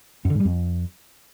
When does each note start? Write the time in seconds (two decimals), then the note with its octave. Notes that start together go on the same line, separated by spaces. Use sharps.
0.25 F#2
0.30 D3
0.35 G#2
0.40 G3
0.45 F2